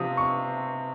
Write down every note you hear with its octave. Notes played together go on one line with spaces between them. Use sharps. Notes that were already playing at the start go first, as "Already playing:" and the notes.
Already playing: C3 F3 C4 D#6
C#6